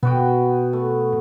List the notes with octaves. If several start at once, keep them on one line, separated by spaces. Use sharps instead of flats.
B2 B3 F#4 G5
A3